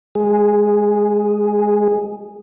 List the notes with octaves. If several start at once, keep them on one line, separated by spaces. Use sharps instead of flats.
G#3 G#4